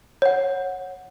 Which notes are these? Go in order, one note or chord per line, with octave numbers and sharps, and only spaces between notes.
C#5 F#5